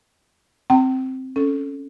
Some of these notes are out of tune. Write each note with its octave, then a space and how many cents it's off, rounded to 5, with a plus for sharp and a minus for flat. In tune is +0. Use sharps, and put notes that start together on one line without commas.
C4 +0 G5 -35 A#5 -45
C#4 +0 A4 -5